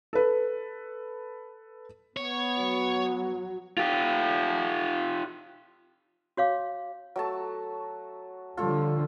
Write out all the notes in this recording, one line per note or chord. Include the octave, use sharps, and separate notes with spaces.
A4 B4
B3 C#5
F#3
F4 G4
F#4 C#5 F5 D6
F#3 A3 A5
D3 F3 G3 F4 A4 C#5